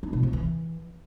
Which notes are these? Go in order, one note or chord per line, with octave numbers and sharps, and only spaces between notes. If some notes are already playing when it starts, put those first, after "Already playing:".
D#4
B2
F3
E3